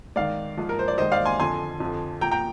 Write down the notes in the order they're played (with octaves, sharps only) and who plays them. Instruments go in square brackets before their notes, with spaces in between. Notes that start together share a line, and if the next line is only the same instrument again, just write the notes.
[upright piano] G#2 D#3 D5 F5
G#2 F3
A#4
C5
D5
G#2 D#3 C5 D#5
D5 F5
G#5 C6
F2 D3 F3 G#5 C6
F2 D3 F3
A#2 F3 G5 A#5
G5 A#5